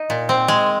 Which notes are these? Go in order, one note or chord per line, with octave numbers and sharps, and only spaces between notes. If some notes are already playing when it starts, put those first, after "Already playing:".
Already playing: D#4
A#2
C4
G#3